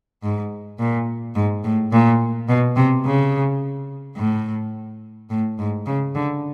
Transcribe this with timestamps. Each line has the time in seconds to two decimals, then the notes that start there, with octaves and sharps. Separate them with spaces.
0.23 G#2
0.79 A#2
1.35 G#2
1.64 A2
1.92 A#2
2.49 B2
2.76 C3
3.05 C#3
4.17 A2
5.30 A2
5.59 G#2
5.86 C#3
6.15 D3